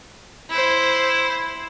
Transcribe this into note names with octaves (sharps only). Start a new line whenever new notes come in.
E4 C5